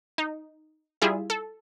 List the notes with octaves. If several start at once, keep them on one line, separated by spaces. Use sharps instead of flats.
D#4
G3 E4 F4 G#4 E5
A4